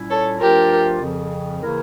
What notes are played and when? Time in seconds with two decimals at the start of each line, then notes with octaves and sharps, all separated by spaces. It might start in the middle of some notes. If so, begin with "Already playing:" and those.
Already playing: A#2 G3 C#4 E4
0.10 A4 C#5
0.40 G2 F3 A3 D4 F4 G4 A#4
1.01 F2 C#3 F3
1.61 C#3 E3 A#3 E4 A#4